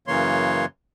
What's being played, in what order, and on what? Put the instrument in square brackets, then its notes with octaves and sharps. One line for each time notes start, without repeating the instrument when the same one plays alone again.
[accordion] F#2 C#3 E3 A#3 C#5 C6